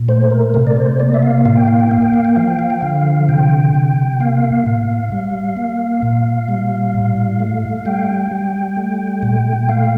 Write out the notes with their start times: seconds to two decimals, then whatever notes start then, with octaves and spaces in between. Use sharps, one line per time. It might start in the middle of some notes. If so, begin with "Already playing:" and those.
Already playing: A#2
0.08 A3 C5
0.31 A#4
0.54 C3 A#4
0.67 D5
0.77 C5
0.99 A#3 D5
1.14 E5
1.22 F5
1.45 A2 F5
1.57 G5
1.68 F5
1.80 G5
1.91 A#3 F5
2.02 G5
2.13 F5
2.25 G5
2.36 F3 F5
2.48 G5
2.59 F5
2.70 G5
2.81 D3 F5
3.29 C3 G5
3.74 C3
4.20 A#3 F5
4.66 A2
5.12 G3
5.57 A#3
6.02 A#2
6.48 G3
6.94 A2
7.40 A3
7.85 G3 G5
8.31 G3
8.77 A3
9.23 A#2
9.69 A3 F5